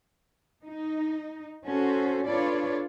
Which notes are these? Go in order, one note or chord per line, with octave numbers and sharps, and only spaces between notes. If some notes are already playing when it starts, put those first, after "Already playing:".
D#4
C#4 F#4 A4 C5
D4 F4 A4 B4 C#5 D5